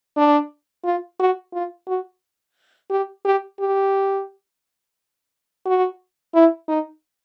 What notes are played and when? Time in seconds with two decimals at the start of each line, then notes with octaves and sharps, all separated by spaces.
0.17 D4
0.84 F4
1.19 F#4
1.53 F4
1.88 F#4
2.90 G4
3.25 G4
3.60 G4
5.66 F#4
6.34 E4
6.68 D#4